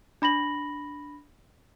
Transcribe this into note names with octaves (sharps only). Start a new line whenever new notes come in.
D4 B5 A#6 F#7